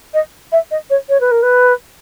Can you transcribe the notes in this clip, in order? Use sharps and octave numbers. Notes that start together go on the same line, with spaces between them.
D#5
E5
D#5
C#5
C#5
B4
A#4
B4